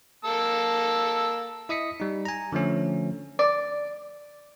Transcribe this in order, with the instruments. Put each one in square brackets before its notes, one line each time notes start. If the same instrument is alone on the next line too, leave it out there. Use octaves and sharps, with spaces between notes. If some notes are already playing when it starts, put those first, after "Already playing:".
[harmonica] A#3 A5 E6
[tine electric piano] E4 D#5 D#6 B6 C#7
G3 D#4
G#5 A#5
D3 F3 A3 C#4
[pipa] D5